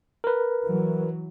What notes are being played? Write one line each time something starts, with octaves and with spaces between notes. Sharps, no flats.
A#4 B4
E3 F#3